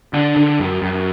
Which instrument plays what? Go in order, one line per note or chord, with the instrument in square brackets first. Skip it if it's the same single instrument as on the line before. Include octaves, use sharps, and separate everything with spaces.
[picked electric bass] D3 D4
D3
F#2
F#2